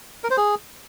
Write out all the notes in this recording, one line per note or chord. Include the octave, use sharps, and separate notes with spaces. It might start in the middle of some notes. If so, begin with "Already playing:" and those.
A#4
C5
G#4